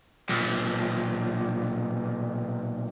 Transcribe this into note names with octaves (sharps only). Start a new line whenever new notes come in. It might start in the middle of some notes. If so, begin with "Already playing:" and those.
B1 A#2